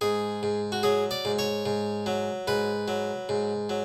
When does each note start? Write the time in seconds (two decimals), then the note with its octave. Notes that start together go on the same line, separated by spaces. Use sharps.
0.01 G#2 G#4
0.43 G#2
0.72 F#4
0.83 F#3 G#4
1.11 D5
1.25 G#2
1.39 C#5
1.66 G#2
2.06 F#3
2.47 G#2 B4
2.88 F#3
3.29 G#2
3.69 F#3